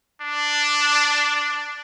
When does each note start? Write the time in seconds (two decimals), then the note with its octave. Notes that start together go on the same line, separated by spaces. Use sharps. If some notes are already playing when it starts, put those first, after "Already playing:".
0.22 D4